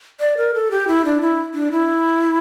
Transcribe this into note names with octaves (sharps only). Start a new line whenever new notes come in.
D5
A#4
A4
G4
E4
D4
E4
D4
E4